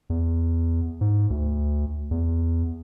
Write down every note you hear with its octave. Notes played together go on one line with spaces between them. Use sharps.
E2
G#2
D2
E2